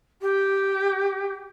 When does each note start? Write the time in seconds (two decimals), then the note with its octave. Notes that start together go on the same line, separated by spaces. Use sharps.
0.21 G4